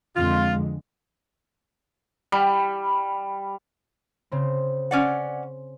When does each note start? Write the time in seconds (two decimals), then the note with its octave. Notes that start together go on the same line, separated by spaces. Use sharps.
0.16 F2 D3 G#3 F4
2.32 G3
4.32 C#3 C4
4.91 C#4 D5 F#5